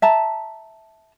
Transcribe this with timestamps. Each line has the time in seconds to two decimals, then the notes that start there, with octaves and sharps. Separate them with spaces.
0.02 E5 A5 A#5